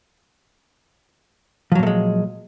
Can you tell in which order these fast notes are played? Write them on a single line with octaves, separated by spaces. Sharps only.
F3 F#3 A#2 A3 G#3